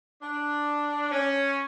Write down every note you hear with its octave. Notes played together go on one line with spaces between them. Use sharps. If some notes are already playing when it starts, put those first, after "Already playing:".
D4
C#4